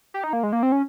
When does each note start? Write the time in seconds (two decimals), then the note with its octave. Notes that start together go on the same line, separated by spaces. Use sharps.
0.14 G4
0.24 D#4
0.33 A#3
0.43 G#3
0.53 A#3
0.63 C4
0.72 C#4